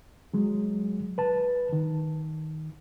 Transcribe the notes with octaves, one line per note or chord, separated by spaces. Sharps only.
F#3 G#3
B4 A5
D#3